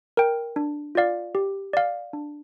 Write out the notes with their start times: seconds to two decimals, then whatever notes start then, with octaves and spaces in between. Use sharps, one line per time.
0.17 A#4 G5
0.56 D4
0.95 F4 D5 F5
1.35 G4
1.73 D5 F5
2.13 D4